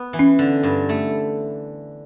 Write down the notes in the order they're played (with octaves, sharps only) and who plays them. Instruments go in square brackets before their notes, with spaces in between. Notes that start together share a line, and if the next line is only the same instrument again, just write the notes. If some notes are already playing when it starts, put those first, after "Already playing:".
Already playing: [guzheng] B3
E3
[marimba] C#4
[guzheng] D3
G2
A3